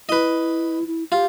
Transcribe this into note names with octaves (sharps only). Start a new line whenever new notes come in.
E4 B4 D#5
E4
F4 G4